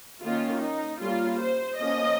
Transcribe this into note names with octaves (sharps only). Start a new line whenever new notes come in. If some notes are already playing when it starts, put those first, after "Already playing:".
D#3 A#3 C#4 F4
D#4
G3 A#3 C#4 F4
C5
F3 A#3 C#4 D#5